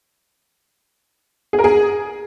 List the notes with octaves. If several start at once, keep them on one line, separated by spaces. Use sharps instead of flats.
G#4
A#4
G#4